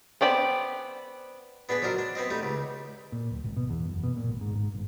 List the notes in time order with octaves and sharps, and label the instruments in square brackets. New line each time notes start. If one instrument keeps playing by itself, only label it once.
[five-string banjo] B3 C4 D5 B5
[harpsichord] B3 D4 G#4 B4
F3 F#3 D4 A#4 D#5
D4
B3 C4 D#5
G3 A3 D#4
C#2
[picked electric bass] A#2
D1
G#1
B2
E2
F#1
B2
A#2
G#1
G#2
G#2
G1